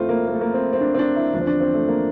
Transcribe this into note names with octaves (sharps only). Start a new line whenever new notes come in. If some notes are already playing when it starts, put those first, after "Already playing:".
Already playing: F2 D3 F3 A3 C4 E4 F4
A#3
A#3
A3
A#3
C4
C4
D4
C4
D4
E4
E2 D3 F3 D4
C4
D4
C4
A3
A#3